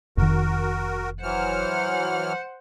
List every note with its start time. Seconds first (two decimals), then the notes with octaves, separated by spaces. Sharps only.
0.17 F1 F2 D#3 F#4 A#4
1.23 E3 F#3 C5 F#5 F6